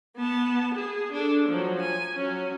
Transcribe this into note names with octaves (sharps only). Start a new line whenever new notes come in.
B3 A5
G#4
D4 A4
F3 F#3
G#5
F#3 C#4